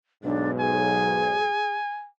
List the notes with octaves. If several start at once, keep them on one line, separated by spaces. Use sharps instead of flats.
B1 G#2 D4
G#4 G#5